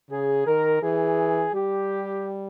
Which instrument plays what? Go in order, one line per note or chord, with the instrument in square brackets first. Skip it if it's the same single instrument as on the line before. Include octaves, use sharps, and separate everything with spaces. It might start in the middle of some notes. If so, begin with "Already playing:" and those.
[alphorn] C#3 [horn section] G#4
[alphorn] D#3 [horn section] A#4
[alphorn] E3 [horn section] G#4
[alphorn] G3 [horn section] G4